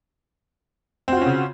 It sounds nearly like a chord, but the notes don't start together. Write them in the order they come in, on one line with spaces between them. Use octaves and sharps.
C4 F#4 F4 C#4 C#3